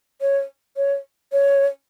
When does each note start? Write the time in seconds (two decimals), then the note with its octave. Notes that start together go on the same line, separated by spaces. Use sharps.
0.21 C#5
0.77 C#5
1.32 C#5